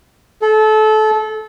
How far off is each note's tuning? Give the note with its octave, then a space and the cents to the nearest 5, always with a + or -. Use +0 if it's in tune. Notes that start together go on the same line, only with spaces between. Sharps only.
A4 -25